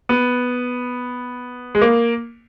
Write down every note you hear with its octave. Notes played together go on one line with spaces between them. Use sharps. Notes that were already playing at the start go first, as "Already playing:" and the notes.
B3
G#3
A#3